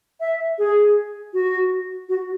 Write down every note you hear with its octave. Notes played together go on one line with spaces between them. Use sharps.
E5
G#4
F#4
F#4